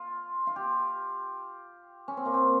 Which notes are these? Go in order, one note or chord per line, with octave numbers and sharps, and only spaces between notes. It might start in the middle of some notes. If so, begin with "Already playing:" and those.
Already playing: F4
F4
G4
C#4
C4
A#3
C4